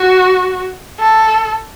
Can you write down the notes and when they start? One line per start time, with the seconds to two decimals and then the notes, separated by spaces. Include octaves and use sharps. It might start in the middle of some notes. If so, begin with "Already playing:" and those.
Already playing: F#4
1.00 A4